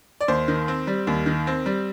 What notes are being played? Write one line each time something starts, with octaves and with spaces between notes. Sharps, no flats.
D5
D#2 C5
D#3
C4
G3
D#2
D#3
C4
G3